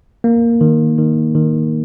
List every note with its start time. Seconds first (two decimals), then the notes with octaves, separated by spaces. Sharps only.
0.24 A#3
0.61 D#3
0.98 D#3
1.35 D#3